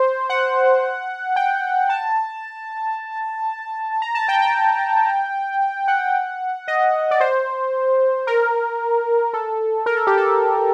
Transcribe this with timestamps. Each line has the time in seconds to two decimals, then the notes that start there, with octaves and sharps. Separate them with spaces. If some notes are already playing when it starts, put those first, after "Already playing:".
Already playing: C5
0.29 F#5
1.36 G5
1.89 A5
4.02 A#5
4.15 A5
4.28 G5
4.41 G5
5.88 F#5
6.68 D#5
7.11 D5
7.20 C5
8.27 A#4
9.33 A4
9.86 A#4
9.96 A4
10.07 G4
10.17 A4